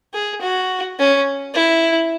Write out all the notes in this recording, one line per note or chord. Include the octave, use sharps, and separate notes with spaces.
G#4
F#4
C#4
E4